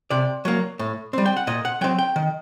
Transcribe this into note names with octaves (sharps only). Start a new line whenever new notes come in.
C3 D5
F#3 A#3
A2
G3 C4
G5
F#5
A#2 D#5
F#5
F#3 C4 G5
G5
D#3